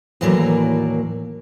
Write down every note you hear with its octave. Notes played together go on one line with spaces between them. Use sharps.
D#2 A2 E3 F#3 A#3 D5